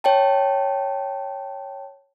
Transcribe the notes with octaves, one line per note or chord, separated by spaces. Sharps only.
C#5 G5 A5